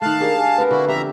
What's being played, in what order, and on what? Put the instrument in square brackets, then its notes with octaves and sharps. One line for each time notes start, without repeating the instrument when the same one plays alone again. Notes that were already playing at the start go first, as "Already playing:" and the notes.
[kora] D#3 A3 [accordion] F5 A5 [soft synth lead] F#6
[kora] D4 G4 G#4 [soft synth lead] A#4
[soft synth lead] G#5
[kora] B3 C4 A#4 [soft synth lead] B4
[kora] D3 [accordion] E4 F#4
[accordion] F2 E5 A#5 [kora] G4